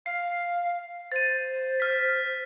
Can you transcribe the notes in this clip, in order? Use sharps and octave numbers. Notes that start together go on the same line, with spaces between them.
F5 C7
C5 A6 D#7
F6 B6